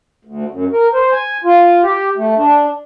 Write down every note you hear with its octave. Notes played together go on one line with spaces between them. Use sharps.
D2
F#2
A#4
C5
G#5
F4
G4
A3
D4